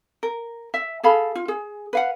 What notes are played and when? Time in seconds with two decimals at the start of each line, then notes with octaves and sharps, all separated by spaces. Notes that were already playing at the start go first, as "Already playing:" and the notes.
0.23 A#4
0.74 E5
1.03 G#4 A4 F5 B5
1.35 F4
1.48 G#4
1.93 B4 F5 F#5